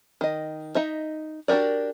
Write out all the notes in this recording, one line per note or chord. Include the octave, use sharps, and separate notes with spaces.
D#3 D#5
D#4 D#5 E5
D4 F#4 G4 A#4 D5